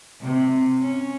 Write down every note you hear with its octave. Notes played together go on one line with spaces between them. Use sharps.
C3
C#4